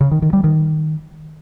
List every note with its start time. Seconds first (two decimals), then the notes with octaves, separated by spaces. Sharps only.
0.01 C#3
0.11 D#3
0.22 D#3
0.33 G3
0.44 D#3